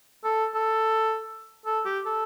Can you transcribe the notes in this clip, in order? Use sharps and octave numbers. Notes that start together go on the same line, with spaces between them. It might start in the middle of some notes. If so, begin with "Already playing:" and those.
A4
A4
A4
G4
A4